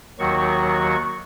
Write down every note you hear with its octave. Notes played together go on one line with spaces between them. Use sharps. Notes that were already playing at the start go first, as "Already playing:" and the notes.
D#2 D#3 F#3 F#4 C#6